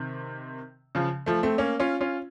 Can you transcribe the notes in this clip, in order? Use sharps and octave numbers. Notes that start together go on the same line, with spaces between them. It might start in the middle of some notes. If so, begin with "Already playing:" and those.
Already playing: C3 D#3
C#3 F3
F3 A3
A3 C4
A#3 C#4
C#4 F4
C#4 F4